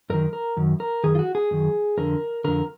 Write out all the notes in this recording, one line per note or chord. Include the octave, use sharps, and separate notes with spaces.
F#2 D#3 A#4
A#4
F#2 D#3
A#4
F#2 D#3 G#4
F4
F#4
G#4
F#2 D#3
F2 D3 A#4
F2 D3 A#4